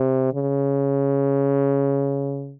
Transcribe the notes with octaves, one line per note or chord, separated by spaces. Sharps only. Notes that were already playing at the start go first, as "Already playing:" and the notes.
Already playing: C3
C#3